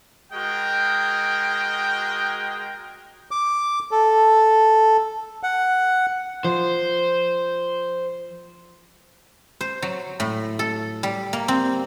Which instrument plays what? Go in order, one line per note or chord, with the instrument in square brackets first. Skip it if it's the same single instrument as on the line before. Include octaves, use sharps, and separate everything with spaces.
[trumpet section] G#3 F#4 A#4 G5
[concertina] D6
A4
F#5
[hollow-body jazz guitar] F3 [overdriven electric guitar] C5
[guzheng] C5
F#3
A2
A4
G3
A#3
C4